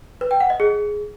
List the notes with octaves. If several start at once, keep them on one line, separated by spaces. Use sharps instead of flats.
B4
G5
F#5
D#5
G#4